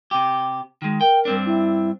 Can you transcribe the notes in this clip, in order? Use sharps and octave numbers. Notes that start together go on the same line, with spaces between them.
C3 G4
D#3 G#3
A#4 G5
G2 C4 D4
E4